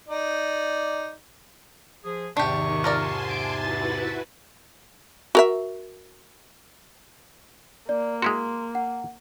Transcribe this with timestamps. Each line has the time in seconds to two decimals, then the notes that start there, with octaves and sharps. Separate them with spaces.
0.09 D#4 D5
2.04 F3 G#4
2.37 E2 G#2 C3 D#3 D4 G4 C#6
2.84 F4 A#4 D5 G#5 A5 C6
3.30 D7
3.60 E4 F#4 B4 A6
5.35 F#4 A#4 E5
7.89 A#3 D5
8.22 G#3 E4 F#4 C6
8.75 F#5